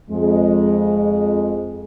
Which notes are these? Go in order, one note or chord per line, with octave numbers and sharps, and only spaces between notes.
F2 G#3